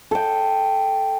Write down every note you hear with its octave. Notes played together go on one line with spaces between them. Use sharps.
A4 G5